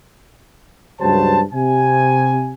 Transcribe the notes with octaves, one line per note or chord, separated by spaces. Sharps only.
C#2 G2 F#3 C5 A5
C3 G#5